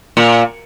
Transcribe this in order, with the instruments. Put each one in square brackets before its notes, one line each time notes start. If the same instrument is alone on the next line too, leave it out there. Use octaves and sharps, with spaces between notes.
[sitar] A#2